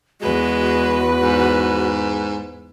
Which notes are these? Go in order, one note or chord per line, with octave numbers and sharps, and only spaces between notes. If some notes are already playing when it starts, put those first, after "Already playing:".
E2 G#3 F#4 B4
G#2